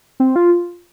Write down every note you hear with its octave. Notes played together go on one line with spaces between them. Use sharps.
C4
F4